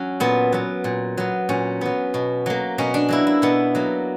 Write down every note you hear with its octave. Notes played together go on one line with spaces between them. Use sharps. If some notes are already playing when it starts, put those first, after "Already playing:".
Already playing: F#3 C#4
A#2 B3
F#3 B3
A#2
F#3 B3
A#2 C#4
F#3 B3
B2
F#3 A#3
B2 C#4
D4
F#3 A#3 E4
E4
B2 B3
F#3 A#3